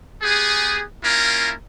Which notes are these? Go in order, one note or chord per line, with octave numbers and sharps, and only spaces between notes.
B3 G4 G#4
A#3 C#4 E4 F4 A#4